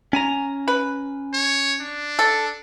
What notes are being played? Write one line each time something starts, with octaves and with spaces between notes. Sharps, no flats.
C#4 G#5 A#5
B4
C#5
D4
A4